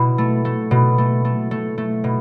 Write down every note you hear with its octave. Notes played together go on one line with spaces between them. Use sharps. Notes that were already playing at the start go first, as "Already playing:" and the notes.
Already playing: B2 E4
A3
A3
B2
A3
A3
A3
A3
B2